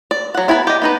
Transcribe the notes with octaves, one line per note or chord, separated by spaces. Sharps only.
D5
F#3 F#5
B3 E4 G#5 A#5 B5
G4 D#5
B3 D#4 B4